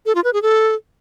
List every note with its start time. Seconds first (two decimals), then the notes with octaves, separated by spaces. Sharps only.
0.06 A4
0.15 F4
0.24 B4
0.33 G#4
0.42 A4